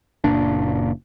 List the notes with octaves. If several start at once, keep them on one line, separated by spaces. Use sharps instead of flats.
F#1 A#2 D4